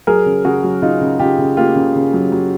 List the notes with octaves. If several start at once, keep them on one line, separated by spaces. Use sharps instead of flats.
F#3 G#4 A#4
C#3
C#3 F#4 G#4
F#3
C#3 D#4 F4
C#3
C#3 F4 G4
C#3
A#3 F4 G4
C#3
C#3
F#3
F#3